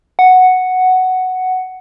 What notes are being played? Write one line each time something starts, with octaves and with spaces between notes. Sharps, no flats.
F#5